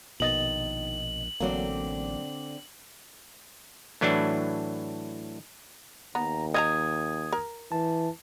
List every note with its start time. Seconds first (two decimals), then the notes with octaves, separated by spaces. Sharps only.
0.20 A#1 B2 D#3 D#5 A6 F#7
1.40 A1 D3 F#3 A#3 C4 D5
4.01 A2 E3 F#3 D4
6.15 D#2 B3 A#5
6.54 D#5 F5 A#5 D#6 G#6
7.32 A#4
7.72 E3 A5